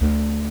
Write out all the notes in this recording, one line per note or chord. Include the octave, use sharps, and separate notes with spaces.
D2